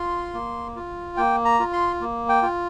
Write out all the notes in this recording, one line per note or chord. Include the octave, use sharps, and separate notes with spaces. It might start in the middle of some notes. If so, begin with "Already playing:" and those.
Already playing: F4 C6
A#3
F4
A#3 G5
A#5
F4
C6
A#3
G5
F4